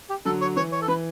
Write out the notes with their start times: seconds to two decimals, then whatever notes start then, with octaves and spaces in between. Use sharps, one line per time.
0.10 G4
0.25 D3 F#3 A4
0.41 C#5
0.56 E3 C#5
0.72 C#5
0.82 A4
0.88 E3 B4